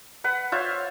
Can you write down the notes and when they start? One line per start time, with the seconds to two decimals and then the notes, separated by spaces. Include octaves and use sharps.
0.24 B4 F#5
0.52 F4 C5 C#5 E5